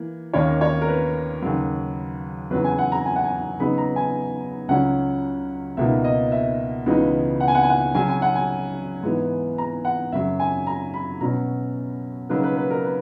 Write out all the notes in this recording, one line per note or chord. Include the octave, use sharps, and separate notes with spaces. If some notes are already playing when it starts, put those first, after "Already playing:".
Already playing: E3 A#3
D#2 D#3 A#3 C#4 C#5
C#5
A#4
B4
D#2 C#3 F#3
E2 C#3 F#3 B4
G#5
F#5
A#5
G#5
F#5
G#5
C#3 F#3 B3 D#4 B5
A#5
G#5
C#2 C#3 F#3 C#4 F#5
C#2 B2 A#3 D#4 E5
D#5
E5
C#2 C#3 E3 B3 D#4
F#5
G#5
F#5
G#5
F#5
C#3 F#3 C#4 G#5
G#5
F#5
G#5
G#2 E3 B3
A#5
F#5
F#2 C#3 F#3 E5
G#5
A#5
B5
B2 F#3 C#4 A#5
C#3 F#3 A#3 D#4 B4
B4
B4
A#4
B4